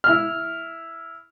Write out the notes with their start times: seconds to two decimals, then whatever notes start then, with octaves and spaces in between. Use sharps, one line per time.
0.04 E4 F6